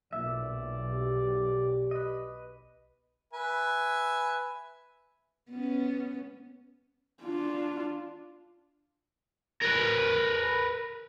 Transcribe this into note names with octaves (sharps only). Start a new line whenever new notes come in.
B1 A#2 D5 E5
G4
B4 D#5
B4 E5 G#5
B3 C#4
D4 F4
A#4 B4